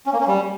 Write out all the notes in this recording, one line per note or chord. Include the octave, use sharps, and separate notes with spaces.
C#4
A#3
C#4
G3